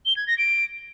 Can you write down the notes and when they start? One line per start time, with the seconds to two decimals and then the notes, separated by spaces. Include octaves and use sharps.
0.06 G7
0.17 G#6
0.27 A#6
0.38 D7